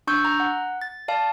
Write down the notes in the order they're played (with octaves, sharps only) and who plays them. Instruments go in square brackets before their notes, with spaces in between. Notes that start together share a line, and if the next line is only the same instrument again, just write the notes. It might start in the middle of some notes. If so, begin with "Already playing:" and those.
[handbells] D4 C#6 E6 G6
A#5
F#5
A6
D5 F5 A5